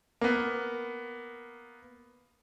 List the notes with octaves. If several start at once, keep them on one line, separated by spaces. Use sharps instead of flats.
A#3 B3